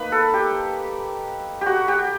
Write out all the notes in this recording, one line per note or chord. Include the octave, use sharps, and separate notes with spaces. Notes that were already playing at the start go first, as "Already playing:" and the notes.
Already playing: A#3 D#4 B4
A4
G4
G4
F#4
G4